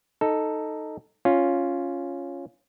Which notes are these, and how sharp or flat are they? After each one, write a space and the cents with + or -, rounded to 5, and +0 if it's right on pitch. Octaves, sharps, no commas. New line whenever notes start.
D#4 +0 A4 +0
C#4 +0 F4 +0